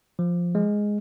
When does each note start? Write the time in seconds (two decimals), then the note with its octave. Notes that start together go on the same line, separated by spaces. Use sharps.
0.19 F3
0.55 G#3